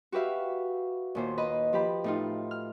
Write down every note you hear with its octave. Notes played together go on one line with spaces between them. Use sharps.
F#4 G4 B4 E5 F5
D#2 A#2 C5
B4 D#5 B5
F3 G4 B5
A2 D#4 F4
F6